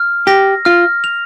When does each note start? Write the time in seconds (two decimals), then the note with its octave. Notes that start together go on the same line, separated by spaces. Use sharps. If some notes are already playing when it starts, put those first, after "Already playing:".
Already playing: F6
0.27 G4 A#6
0.65 F4 F6
1.04 F7